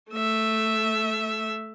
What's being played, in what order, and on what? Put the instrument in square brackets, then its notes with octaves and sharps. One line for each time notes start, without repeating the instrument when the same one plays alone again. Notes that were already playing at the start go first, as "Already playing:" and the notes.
[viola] A3 E5